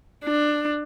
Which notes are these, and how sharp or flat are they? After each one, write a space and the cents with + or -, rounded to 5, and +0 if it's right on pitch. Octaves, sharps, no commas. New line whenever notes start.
D4 +15